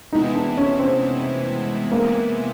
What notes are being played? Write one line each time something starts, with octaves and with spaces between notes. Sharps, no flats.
C3 E3 G#3 B3 D#4 E4
D4
C#4
C4
A#3